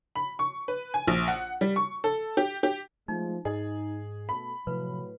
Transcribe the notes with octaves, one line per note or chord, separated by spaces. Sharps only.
B5
C#6
B4
G#5
A#1
F#5
G3
C#6
A4
G4
G4
F3 G#3 A3 D#4
G#2 D#4 G#4 D#5
B2 A3 A4 B5
A2 C3 F3 F#3 B4